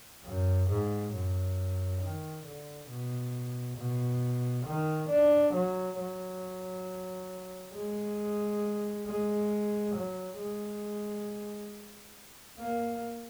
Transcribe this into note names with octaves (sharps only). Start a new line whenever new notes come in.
F#2
G#2
F#2
D#3
D3
B2
B2
D#3
D4
F#3
F#3
G#3
G#3
F#3
G#3
A#3